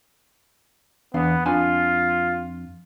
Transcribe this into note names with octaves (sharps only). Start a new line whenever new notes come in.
E2 B3 D4 F5
F2 D4 F4 G#5